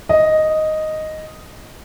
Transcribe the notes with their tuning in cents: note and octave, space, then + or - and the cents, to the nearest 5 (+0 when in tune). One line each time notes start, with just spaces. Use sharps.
D#5 +0